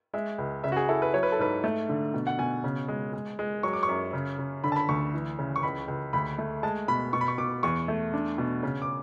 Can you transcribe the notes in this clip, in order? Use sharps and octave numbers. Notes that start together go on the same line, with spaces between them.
G#3 E5
C#2
C#3 E5
F#4
G#4
E4 A4
B4
F#3 C#5
B4
A4
G#2 B4
A3
D3
B2
F#5
B2 G#5
C#3
G#3
G#3
G#3
F#3 C#6
D6
C#6
F#2
C#3
C#3
D3 B5
A5
B5
D2 C#6
E3
C#3
C#6
C#2 B5
C#2
D2 B5
A3
G#3 A5
B2 B5
B2 C#6
B5
C#6
B2 D6
E2 C#6
A3
D4
B2
C#3
D6